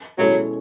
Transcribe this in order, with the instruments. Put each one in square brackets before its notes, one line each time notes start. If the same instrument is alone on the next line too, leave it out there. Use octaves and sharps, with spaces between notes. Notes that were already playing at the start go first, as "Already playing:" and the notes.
[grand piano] B2 G#3 C#4 E4 A4 [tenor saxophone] F#3